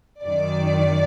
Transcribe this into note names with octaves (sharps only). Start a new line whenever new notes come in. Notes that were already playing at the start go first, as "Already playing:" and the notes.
F#2 D#3 D5